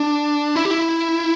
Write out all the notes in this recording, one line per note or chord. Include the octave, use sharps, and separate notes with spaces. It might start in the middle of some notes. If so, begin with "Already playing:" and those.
Already playing: D4
E4
G4
E4